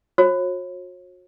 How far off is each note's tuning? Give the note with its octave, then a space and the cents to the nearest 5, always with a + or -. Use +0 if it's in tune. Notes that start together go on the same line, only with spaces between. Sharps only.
F#4 -40 C#5 -40